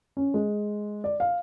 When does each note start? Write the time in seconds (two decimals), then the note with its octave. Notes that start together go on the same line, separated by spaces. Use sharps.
0.17 C#4
0.34 G#3
1.04 D5
1.20 F5